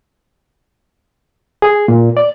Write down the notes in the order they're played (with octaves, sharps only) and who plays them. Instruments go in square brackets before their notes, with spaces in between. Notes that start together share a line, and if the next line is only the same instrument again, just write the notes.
[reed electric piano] G#4
A#2
D5